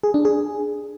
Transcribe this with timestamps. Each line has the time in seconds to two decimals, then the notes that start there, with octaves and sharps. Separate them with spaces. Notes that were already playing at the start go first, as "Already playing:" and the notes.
0.03 G#4
0.14 D4
0.25 G#4